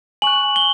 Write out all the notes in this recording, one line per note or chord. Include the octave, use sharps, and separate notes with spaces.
G#5 C#6 F#6 F#7
G7